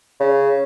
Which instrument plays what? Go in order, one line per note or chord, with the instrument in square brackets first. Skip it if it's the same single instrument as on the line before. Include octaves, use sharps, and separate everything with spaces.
[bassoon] C#3